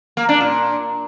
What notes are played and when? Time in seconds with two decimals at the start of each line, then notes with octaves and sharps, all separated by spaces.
0.17 A#3
0.29 D4
0.41 A#2